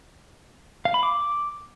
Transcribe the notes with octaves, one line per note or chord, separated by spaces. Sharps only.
F5
B5
D6